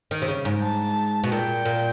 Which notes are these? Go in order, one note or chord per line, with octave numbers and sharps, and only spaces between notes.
D#3
C3
C#3
G#2
A5
B2
A#2 G5
A#2